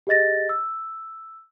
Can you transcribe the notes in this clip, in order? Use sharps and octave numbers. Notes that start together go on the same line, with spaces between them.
G4 G#4 D#5 A6 A#6
E6